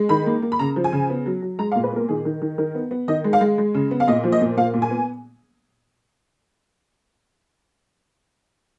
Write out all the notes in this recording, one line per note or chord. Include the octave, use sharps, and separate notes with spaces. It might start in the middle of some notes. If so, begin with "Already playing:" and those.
Already playing: G#3
D#3 B5
A#3
A#3
B5
C#3 A#5
F3
G#5
C#3
B3
F#3
F#3
G#3 A#5
F5
A#2
B4
B3 A#4
D#3 G#4
D#3
D#3
D#3 A#4
B3
B3
D#3 D#5
G#3
F5
G#3
G#3
C#3
B3
F5
A#2 D#5
F3
D#5
A#2
A#2 F5
A#2
G#5
B3